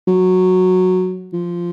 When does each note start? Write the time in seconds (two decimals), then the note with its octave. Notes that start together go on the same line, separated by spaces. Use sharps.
0.08 F#3
1.33 F3